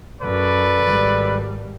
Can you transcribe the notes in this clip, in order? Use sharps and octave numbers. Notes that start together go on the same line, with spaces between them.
F#2 A4 B4 D5
G#1 G3